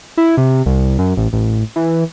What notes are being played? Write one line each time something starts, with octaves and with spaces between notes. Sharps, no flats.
E4
C3
C2
F#2
A1
A1
E3